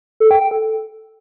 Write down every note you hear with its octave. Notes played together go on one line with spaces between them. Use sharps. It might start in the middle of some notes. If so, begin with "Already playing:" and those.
A4
G5
G5
A4